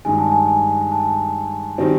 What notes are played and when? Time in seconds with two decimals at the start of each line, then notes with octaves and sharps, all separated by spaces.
0.05 G2 D#3 G#3 G#5
0.18 A5
0.31 G#5
0.48 G#5
0.92 A5
1.78 D#3 G3 C4